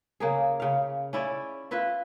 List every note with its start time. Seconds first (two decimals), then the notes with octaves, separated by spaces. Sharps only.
0.20 C#3 A#3 G#4
0.60 C#3 F5
1.13 C#4 E4 D5
1.71 E4 F4 B4 E5